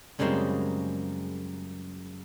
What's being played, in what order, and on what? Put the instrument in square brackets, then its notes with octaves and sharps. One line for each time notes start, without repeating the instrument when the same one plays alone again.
[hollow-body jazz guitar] F#2 C#3 G3 G#3 A#3 C4